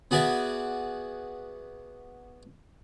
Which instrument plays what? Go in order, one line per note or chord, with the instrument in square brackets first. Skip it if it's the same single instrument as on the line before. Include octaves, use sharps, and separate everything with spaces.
[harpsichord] B3 F#4 G#4 D5 E5